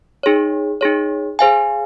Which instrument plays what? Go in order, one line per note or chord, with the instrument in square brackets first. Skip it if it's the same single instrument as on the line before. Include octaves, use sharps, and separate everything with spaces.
[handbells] D#4 G#4 C#5
D#4 G#4 C#5
G#4 C5 F5 G#5